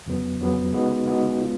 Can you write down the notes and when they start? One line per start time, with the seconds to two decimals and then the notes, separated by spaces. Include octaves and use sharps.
0.06 F2 C#3 F#3 B3
0.40 F2 C#3 F#3 B3
0.73 C#3 G#3 B3 D#4 F#4
1.06 C#3 G#3 B3 D#4 F#4
1.40 C#3 G#3 B3 F4